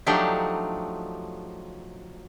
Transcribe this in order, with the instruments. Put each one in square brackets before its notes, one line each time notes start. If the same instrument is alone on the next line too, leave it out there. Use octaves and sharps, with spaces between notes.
[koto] F3 F#3 A3 D4 D#4 G4